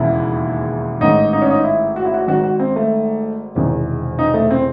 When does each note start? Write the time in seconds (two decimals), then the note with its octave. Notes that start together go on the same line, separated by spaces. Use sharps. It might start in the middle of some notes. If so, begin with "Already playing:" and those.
Already playing: E1 D#2 C#3 E3 E4
1.00 A1 G#2 D#3 D#4
1.33 D#4
1.42 C#4
1.50 D#4
1.64 E4
1.96 F#4
2.05 E4
2.14 F#4
2.27 G#1 G#2 D#3 F#4
2.44 F#4
2.59 C4
2.76 A3
3.55 E1 E2 C3 D#3
4.19 D#4
4.34 A3
4.51 C4